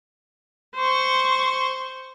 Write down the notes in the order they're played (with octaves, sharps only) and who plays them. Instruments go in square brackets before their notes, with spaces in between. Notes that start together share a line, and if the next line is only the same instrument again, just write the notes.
[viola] C5 C#6